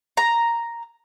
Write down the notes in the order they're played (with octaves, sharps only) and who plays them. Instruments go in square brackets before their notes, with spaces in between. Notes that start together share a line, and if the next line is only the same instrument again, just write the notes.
[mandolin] A#5